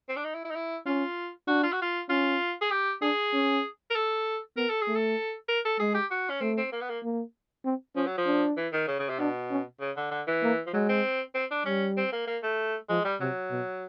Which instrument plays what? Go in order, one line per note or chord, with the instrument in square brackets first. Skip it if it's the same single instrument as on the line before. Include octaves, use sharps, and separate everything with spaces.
[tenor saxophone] C4
D4
D#4
E4
E4
D#4
E4
[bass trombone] C#4 [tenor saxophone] F4
[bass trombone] D4 [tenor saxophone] F#4
[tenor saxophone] F4
F#4
F4
[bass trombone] C#4 [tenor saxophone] F4
[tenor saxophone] G#4
G4
[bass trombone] D4 [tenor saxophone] G#4
[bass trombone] C#4
[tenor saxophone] A#4
A4
[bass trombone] B3 [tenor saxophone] A#4
[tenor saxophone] A4
G#4
[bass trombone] A3
[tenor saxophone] A4
A#4
A4
[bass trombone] G#3 [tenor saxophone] G#4
[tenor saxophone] G4
F#4
C#4
[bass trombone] A3 [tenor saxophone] C4
[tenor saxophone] C4
A#3
B3
A#3
[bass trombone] A#3
C4
[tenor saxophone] F3 [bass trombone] C#4
[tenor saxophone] F#3
F3
[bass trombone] D4
[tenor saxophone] E3
D#3
C#3
C#3
C3
[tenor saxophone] B2 [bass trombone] D4
[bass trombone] C#4
[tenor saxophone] C#3
D3
D3
E3
[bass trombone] A#3
[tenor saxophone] F3
[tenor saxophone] F#3 [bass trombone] G#3
[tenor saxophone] C4
C4
D4
[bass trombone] G3 [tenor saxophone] C#4
[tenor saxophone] C4
A#3
A#3
A3
[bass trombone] F3 [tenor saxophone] G#3
[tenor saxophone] G3
[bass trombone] C3 [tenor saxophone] F#3
[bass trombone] B2